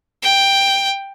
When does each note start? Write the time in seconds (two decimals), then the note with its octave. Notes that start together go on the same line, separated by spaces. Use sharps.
0.23 G5